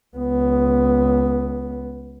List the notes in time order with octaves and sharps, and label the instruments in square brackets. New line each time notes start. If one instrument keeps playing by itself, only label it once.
[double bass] C#2 B3